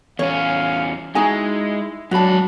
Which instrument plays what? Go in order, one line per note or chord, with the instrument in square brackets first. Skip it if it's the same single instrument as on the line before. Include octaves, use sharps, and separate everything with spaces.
[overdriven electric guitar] E2 C#4 [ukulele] C#5 [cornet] F5
[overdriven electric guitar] G#3 [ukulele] D#4 F#4 G#5 [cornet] E4
[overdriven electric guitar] G#2 B5 [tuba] F#3 [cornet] D4 [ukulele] F#4 A5